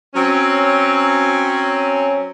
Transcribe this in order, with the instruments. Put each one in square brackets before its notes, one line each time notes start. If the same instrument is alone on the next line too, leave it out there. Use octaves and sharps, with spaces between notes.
[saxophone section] F#3 C4 C#4